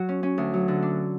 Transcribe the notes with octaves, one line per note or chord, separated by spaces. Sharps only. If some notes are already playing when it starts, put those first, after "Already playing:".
Already playing: F#3 F#4
C#4
C#4
D2
F#3
D3
D4